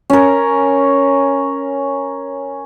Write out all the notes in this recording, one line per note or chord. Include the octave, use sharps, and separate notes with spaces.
C#4 A#4